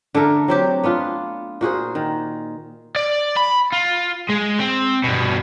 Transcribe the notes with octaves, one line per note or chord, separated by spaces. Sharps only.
D3 A3 A4 A#4
F#3 C4 G4
B3 D4 F4
A#2 F#4 G#4 C5
D#3
D5
B5
F4
G#3
C4
G2 B2